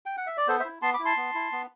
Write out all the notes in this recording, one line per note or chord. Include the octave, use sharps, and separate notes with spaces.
G5
F#5
E5
D5
B3 A4 C5
C5 E5
E4
B3 A5 C6
B5 D6
E4
A5 C6
B3
E4
B3